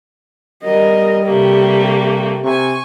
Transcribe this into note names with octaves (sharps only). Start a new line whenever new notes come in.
G3 A#4 D#5
C3 A3 A#3 G4
C3 G#5 C#6